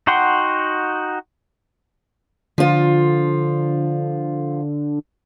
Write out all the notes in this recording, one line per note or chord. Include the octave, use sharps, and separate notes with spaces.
D#4 F#4 F#5 G5 C6
D3 F3 F4